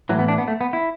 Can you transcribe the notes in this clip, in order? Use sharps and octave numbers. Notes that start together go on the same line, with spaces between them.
A2 E3 F#3
B3
D4
B3
A3
B3
E4